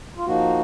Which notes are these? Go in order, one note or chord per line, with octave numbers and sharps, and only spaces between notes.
F4
F3 A#3 D#4 F#4